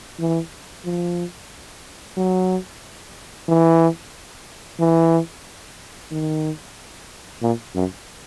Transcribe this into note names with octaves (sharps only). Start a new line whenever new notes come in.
E3
F3
F#3
E3
E3
D#3
A#2
F#2